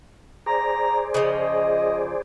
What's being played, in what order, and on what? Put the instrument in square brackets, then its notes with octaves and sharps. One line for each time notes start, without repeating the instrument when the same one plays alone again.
[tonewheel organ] G#4 C5 D5 [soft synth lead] A#5
[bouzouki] C#3 F3 [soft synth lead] D#5